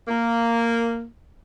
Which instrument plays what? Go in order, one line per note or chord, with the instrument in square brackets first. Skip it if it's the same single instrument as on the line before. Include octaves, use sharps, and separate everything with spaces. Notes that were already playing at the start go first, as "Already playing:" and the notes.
[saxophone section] A#3